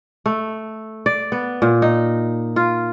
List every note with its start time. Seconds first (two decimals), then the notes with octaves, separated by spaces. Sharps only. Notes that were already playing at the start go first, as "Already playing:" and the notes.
0.26 A3
1.06 D5
1.32 B3
1.62 A#2
1.82 D#4
2.56 F4